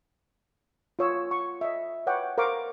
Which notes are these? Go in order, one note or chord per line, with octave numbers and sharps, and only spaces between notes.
F4 C#5 E6
C#6
D#5 E5
B4 C#5 F#5 G5 D6
A#4 C5 F5 F#5 C#6 D6